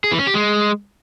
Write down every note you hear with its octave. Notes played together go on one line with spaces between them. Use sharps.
G#4
E3
C#4
G4
G#3